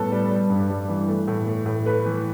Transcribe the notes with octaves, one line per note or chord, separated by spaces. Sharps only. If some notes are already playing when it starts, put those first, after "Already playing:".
Already playing: A2 G3 B3 A4 B4 A5
G3 B4
G3
G2
G3
E3
A3
A2
A3
A2
A3 B4
E3